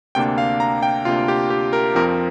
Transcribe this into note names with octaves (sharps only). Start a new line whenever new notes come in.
D2 C3 A#3 D4 G5
F5
A#5
G5
D2 C3 A#3 D4 F4
G4
G4
A#4
F2 F3 C4 A#4